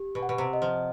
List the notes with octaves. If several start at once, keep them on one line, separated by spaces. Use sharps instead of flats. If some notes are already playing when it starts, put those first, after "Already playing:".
Already playing: G4
B2
F#5
B2
C3
D#5
F3